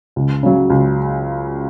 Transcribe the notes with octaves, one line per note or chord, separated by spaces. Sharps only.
C#2
C#3 F#3
C#2